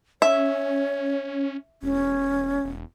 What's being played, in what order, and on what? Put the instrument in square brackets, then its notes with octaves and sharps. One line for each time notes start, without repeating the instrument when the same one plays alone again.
[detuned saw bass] C#4 [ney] C#5 [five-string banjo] E5
[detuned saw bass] E1 [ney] C#4
[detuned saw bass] E1